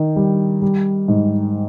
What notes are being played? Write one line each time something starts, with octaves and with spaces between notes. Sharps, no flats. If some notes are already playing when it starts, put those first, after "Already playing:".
Already playing: D#3
G3
G3
G#2